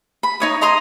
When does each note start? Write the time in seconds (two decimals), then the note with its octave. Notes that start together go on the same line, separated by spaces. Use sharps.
0.23 B5
0.40 D#4 C#5 D#6
0.61 D#5 A#5 C6 D#6